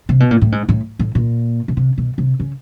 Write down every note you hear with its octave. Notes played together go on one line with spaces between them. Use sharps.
C3
B2
A#2
A2
G#2
A2
A2
A#2
B2
C3
B2
C3
C#3